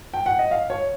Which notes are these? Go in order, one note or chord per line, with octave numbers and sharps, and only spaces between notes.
G5
F#5
D#5
F5
C#5